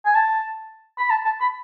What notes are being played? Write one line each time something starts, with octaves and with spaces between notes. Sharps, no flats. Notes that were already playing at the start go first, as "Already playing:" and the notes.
G#5
A5
B5
A5
A5
B5